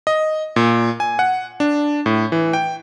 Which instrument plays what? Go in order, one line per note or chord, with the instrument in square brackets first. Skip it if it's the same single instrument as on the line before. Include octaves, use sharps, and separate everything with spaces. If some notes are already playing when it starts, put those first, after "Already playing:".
[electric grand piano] D#5
A#2
G#5
F#5
D4
A2
E3
G5